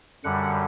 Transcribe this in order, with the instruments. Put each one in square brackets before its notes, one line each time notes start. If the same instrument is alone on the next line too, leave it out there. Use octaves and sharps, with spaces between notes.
[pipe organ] F#2 D3 G3 F#5